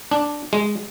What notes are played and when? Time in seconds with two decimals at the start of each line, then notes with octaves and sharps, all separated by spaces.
0.11 D4
0.53 G#3